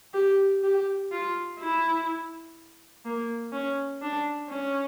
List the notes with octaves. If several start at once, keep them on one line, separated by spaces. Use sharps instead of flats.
G4
G4
F4
E4
A#3
C#4
D4
C#4